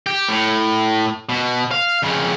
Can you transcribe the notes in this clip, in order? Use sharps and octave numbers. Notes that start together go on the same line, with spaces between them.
G4
A2
B2
F5
F2 C#3